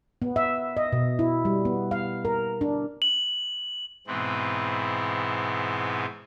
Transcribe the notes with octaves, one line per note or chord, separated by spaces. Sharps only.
B3
E5
D#5
B2
E4
G3
B3
F5
A#4
D4
F#7
G#2 B2 E3 G#3 B3 C4